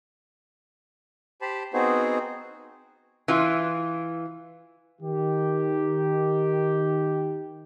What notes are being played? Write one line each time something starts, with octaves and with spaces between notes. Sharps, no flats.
G4 C5 A5 B5
B3 C4 D#4 F#4 G#4 C5
E3 F4
D#3 G4